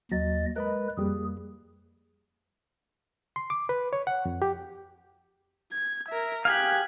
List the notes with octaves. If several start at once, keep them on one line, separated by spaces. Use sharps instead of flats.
D#2 F#3 D#5 A6
G#3 A#4 B4 D#5 B5
F2 G3 A#3 G#4
C6
D6
B4
C#5
F#5
F2
G4
G#6
A#4 E5
G4 G#4 F5 F#6 G#6